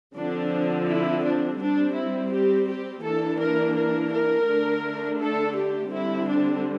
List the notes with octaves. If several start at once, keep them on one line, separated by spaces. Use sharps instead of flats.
D3 F3 C4 D4
E4
D4
G3 C4 D4
E4
G4
G4
E3 A#3 D4 A4
A#4
A#4
A#4
D3 A3 D4
A4
G4
D3 G3 C4 E4
D4